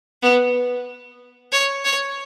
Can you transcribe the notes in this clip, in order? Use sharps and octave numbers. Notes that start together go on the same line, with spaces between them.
B3
C#5
C#5